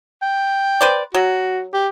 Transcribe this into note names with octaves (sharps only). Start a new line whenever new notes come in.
G5
B4 C5 D5
F#3 F#4
G4